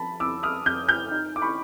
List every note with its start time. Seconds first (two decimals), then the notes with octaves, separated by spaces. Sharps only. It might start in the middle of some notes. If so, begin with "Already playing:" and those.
Already playing: F3 A5 B5
0.20 F2 D6 E6
0.43 D#6 F6
0.66 F2 F6 G6
0.89 F6 G6
1.11 D#4
1.36 D6
1.42 B5 C#6